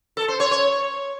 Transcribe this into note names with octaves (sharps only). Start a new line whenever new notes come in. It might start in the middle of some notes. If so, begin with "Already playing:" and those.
A4
C5
C#5
C#5